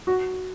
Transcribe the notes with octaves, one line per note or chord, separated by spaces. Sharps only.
F#4